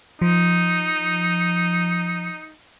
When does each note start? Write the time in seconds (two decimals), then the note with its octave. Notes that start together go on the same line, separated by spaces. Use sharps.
0.22 F3 D#4